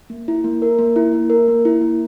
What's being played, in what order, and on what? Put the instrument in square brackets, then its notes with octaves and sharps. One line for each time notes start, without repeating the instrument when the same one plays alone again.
[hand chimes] A#3
E4
A#3
A#4
A#3
E4
A#3
A#4
A#3
E4
A#3